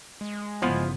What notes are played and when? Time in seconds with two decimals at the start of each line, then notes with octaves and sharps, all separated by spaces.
0.21 G#3
0.62 G1 C#3 F3 B3 E4 F4